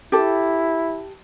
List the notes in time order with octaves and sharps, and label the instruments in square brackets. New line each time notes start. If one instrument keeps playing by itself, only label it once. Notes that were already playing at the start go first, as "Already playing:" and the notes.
[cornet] E4 [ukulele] G4 A4